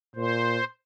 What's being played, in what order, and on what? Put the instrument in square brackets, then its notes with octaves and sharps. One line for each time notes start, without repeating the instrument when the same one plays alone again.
[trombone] A#2 [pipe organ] C5